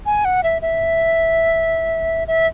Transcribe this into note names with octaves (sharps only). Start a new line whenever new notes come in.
G#5
F#5
E5
E5
E5